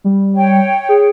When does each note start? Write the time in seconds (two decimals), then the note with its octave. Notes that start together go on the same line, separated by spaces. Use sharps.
0.04 G3
0.35 C#5 G5
0.89 G#4